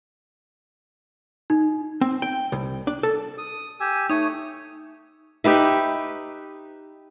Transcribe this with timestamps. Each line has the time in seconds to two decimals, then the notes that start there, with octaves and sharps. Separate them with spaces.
1.50 D#4
2.01 C4
2.22 G5
2.52 C2
2.87 D4
3.03 A4
3.38 D#6
3.80 G4 G#5 E6
4.10 A3 D#4 C#5 D#6
5.44 D#4 G4 B4 E5